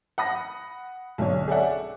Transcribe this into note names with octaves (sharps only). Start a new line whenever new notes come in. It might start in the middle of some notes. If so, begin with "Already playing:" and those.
F#5 B5 D#6 A#6
B1 D3 C#5
G#4 A4 C#5 D5 E5 F#5